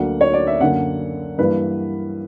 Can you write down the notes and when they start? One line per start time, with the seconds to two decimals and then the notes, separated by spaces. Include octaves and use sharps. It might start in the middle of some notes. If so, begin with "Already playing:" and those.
Already playing: D2 D3 F#3 A#3 F#5
0.21 C#5
0.33 D5
0.47 E5
0.60 F#2 D3 A#3 F#5
1.38 G2 E3 A#3 B4